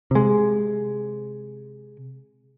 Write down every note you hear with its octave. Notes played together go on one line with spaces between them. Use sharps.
C3 G#3